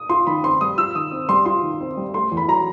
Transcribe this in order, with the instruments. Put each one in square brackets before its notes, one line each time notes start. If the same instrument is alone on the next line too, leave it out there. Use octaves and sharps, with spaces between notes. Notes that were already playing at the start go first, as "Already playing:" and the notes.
Already playing: [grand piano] D#6
[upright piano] F4 [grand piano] C6
[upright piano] D#3 [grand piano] B5
[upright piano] C4 [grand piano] C6
[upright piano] G3 [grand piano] D#6
[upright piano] F4 [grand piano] E6
[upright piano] D#3 [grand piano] D#6
[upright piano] C4
[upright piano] G3 [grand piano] C6
[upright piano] F4 [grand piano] C6
[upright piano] D#3
C4
G3
[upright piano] A3 [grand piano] C6
[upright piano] E2
[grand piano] B5
[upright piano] F#3 [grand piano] A#5